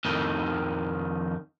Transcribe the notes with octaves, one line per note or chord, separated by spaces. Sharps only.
F2 D#3